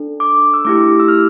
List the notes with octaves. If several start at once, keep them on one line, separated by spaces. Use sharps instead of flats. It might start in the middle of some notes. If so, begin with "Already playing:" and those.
Already playing: D4 A4
D6
E6
A3 E4 G4 D6
E6
F6